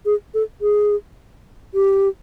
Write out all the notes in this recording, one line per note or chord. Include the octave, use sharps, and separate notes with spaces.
G#4
A4
G#4
G4